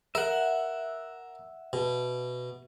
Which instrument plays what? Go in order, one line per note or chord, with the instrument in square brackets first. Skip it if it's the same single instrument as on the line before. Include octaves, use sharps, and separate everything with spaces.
[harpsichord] A#4 [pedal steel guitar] E5 F#5
[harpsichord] B2